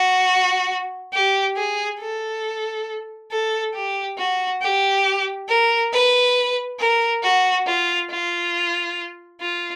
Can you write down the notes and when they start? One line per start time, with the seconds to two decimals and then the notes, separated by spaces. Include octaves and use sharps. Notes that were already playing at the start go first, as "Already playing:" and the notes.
Already playing: F#4
1.13 G4
1.56 G#4
2.00 A4
3.31 A4
3.74 G4
4.18 F#4
4.62 G4
5.49 A#4
5.93 B4
6.79 A#4
7.23 F#4
7.66 F4
8.10 F4
9.41 F4